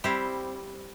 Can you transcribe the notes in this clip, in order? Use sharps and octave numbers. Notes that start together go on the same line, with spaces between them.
G3 C4 E4 G4